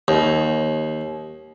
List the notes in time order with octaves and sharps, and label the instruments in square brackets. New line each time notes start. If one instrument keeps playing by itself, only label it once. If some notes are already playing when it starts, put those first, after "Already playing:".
[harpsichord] D#2